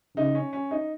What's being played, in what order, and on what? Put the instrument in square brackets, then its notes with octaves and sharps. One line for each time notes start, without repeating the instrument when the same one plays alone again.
[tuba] C#3 [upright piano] D#4
[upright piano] C#4
C#4
D#4